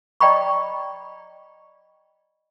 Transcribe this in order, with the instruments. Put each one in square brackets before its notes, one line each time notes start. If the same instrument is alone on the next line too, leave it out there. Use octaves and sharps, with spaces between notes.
[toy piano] D5 D#5 G5 A#5 B5 C#6